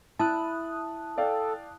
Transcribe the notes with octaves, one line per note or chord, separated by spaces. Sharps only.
E4 A5 D#6 F#6
A4 D5 F5 G5